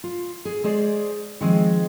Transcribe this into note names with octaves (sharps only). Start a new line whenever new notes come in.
F4
G#4
G#3 G#4 C5 D5
D#3 F3 G#3 C4